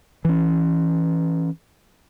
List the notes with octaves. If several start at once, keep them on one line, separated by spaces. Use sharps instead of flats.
E3 C#4